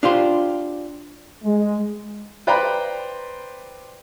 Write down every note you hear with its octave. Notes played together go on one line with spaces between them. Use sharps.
D4 F4 G4 C5
G#3
B4 C5 D5 G5 A#5 B5